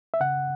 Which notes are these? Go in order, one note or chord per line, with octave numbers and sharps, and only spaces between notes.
E5
C#3 F#5